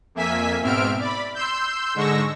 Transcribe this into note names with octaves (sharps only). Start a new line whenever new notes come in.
F2 A#3 E5 G#5 B6
G#2 B2 C4 E5 F6 D7
D5 B5
C6 E6 G6
G#2 D3 G#3 C#6 E6 A#6